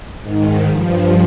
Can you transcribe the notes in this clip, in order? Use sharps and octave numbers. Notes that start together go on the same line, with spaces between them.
G#2 D#3
G2 F3